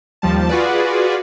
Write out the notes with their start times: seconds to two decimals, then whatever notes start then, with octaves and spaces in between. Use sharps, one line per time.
0.22 D#2 F3 G3 A5
0.49 F4 F#4 G#4 B4 D5